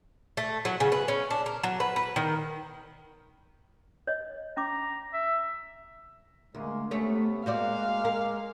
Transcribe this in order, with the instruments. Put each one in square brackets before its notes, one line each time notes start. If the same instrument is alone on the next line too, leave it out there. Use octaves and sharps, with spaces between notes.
[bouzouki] A3
F#3
C#3
B4
C#4
D4
A#4
F#3
B4
B4
D#3
[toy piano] C#5 D#5
[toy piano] C#4 D6 [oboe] A#5
[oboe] E5
[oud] D2 [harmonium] G#3 A#3
[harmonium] C3 B3 C#4 [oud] A3 C#5
[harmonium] G#3 A#3 [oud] F#4 C5 D5 [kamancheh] F5
[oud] A#4